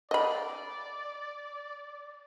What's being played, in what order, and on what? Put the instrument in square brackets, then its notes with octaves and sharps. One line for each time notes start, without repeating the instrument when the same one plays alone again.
[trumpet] D5 [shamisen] D#5 B5